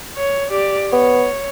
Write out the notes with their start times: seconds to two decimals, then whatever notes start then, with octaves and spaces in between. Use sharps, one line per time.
0.17 C#5
0.50 G4 D5
0.93 B3 C#5